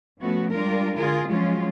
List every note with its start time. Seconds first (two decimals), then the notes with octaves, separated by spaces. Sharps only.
0.20 F3 A3 B3 C#4 F#4
0.52 G3 G#3 D4 F4 A#4
0.96 D3 F4 G#4 A#4
1.28 F3 F#3 G#3 C#4 F4